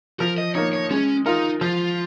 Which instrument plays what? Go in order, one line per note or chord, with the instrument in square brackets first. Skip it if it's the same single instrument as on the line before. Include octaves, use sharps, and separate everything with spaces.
[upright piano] F3 [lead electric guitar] A#4
[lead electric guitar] D#5
[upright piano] A#3 D#4 [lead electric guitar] C#5
[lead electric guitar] C#5
[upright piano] G#3 [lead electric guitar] C#4
[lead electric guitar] D#4 [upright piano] F4 A#4
[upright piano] F3 [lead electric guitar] F4